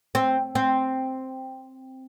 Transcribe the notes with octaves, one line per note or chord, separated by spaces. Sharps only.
C4
C4